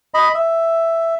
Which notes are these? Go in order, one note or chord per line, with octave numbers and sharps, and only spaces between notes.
D#5 B5
E5